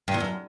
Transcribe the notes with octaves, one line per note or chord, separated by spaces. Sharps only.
G2
E2
F#2